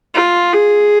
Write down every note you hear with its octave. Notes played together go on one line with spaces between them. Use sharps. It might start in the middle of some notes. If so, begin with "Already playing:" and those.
F4
G#4